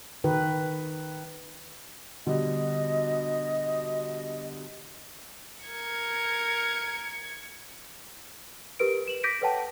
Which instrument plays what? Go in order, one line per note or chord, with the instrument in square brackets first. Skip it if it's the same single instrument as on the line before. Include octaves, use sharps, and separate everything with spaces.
[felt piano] D#3 [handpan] B4
[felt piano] B2 D3 G3 [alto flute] D#5
[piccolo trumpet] A#4 [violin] G#6 C#7
[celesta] G4 A#4 B4 D7
E7 F#7
D6 G6 A#6 B6 D7 D#7
A4 B4 C#5 F#5 G5 A5